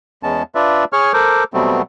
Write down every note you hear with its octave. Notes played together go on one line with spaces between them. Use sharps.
E2 G#3 B3 C#4 A5
D4 F4 B4 D5 E5
G#4 C#5 C#6 F6
A4 A#4 C5 D6
B2 F#3 G3 A3 B3 C4